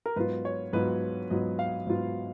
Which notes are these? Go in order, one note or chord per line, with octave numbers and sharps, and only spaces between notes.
A#4
G#2 F#3 B3 F4 B4
C#5
G#2 F#3 B3 F4 B4
G#2 F#3 B3 F4 D#5
F5
G#2 F#3 B3 F4